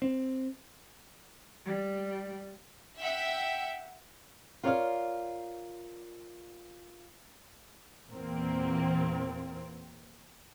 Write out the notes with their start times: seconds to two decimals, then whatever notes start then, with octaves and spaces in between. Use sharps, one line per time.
0.02 C4
1.65 G3
2.98 E5 F#5 G5 E6 G6 B6
4.63 F4 A#4 C#5 D5 E5 F5
8.09 E2 A#2 A#3 C4